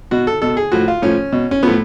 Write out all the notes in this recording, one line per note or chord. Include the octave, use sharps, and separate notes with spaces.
B2 F#4
A4
B2 A4
G#4
A2 F3 F#4
F4
A2 F3 C#4
B2
C#4
A2 F3 B3